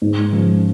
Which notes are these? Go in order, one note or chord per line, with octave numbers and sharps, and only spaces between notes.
G#2
F3 G#3 C#4